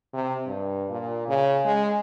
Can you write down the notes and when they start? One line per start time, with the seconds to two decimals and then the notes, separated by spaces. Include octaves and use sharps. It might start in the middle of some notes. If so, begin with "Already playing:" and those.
0.13 C3
0.47 G2
0.90 A#2
1.28 C#3
1.65 G#3